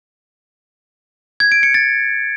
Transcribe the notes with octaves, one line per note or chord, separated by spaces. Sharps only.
G#6
D7
C#7
A6